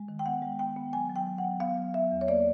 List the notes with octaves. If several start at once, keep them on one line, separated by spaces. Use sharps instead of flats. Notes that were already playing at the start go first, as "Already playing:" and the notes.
Already playing: G#3
D#3
G5
B3 F#5
G#3
B3 G5
B3
F#3 G#5
F#3
G5
F#3
F#5
B3
B3 F5
F#3
B3 E5
E2
C#5
A#3 D5